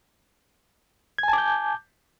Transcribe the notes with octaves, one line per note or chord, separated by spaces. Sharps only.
G#5 A5 D6 G6 G#6